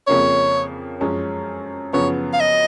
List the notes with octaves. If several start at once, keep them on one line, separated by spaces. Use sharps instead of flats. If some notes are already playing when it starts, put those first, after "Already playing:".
F2 C#3 F3 A#3 C#4 C#5
F#2 F3 G#3 C#4
F#2 C#3 F3 B3 C#5
F5
D#5